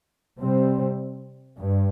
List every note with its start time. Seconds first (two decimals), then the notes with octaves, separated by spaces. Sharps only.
0.40 C3 G3 C4
1.60 G2